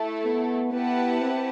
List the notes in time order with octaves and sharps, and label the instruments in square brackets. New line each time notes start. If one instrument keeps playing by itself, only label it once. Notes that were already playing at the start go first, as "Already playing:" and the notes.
Already playing: [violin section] A3 E4 A4
[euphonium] B3
[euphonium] B3 [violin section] E4 G4 B4 F#5 A5
[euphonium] C4